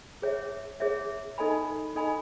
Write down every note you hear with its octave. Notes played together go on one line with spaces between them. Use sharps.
G#4 C#5 E5
G#4 C#5 E5
D#4 A4 D#5 G#5 B5
D#4 A4 D#5 G#5 B5